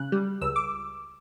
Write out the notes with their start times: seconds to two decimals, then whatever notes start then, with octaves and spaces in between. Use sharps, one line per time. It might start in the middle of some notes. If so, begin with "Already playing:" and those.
Already playing: C#3 F#6
0.12 G3
0.41 C#2 E6
0.56 D6